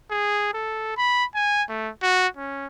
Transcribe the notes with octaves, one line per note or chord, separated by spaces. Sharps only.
G#4
A4
B5
G#5
A3
F#4
C#4